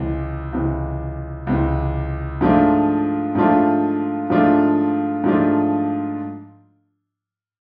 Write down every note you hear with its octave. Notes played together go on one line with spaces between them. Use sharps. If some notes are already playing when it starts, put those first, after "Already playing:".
Already playing: C#2 C3 E3
C#2 C3 E3
C#2 C3 E3
G#2 F3 A3 D4 F4
G#2 F3 A3 D4 F4
G#2 F3 A3 D4 F4
G#2 F3 A3 D4 F4